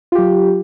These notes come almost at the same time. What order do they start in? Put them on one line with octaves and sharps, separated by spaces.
F4 G4 F#3